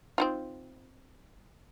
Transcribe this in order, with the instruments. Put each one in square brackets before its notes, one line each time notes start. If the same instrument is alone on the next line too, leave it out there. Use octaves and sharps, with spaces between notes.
[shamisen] C4 D#4 F4